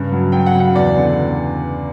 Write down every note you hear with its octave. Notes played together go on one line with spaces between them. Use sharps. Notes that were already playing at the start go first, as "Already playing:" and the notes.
Already playing: G2 C#3
F#3
F#3 G5
F#5
C#3
F#5
E2 D5
D3